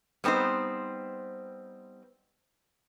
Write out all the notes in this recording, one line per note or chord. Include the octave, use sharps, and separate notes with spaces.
G3 B3 C4 D#4 C5